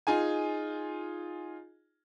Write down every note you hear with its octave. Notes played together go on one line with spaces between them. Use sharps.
D#4 F4 G#4 G#5